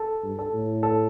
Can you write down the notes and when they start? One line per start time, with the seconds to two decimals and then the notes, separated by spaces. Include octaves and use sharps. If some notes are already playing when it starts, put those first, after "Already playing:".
Already playing: A4
0.23 G2
0.39 A4
0.53 A2
0.83 A4